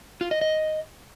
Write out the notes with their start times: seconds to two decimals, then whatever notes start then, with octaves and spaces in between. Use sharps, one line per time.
0.21 F4
0.31 D#5
0.41 D#5